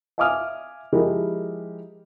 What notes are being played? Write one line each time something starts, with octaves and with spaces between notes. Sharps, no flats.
E5 F5 G#5 D6 D#6 F6
F3 G#3 E4 G4 A#4 D#5